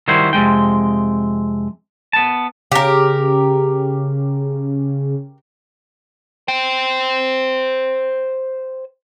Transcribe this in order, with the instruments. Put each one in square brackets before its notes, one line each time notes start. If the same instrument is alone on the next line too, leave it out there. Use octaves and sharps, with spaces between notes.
[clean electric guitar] D#3 G3 E4 F#4 C5
F2 C3 G#3 G5
B3 A5
[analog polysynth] C#3 [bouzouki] G4 A#4
[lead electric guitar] C5 G5